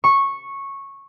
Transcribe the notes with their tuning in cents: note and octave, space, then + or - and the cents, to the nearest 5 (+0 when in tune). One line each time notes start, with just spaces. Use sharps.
C#6 -10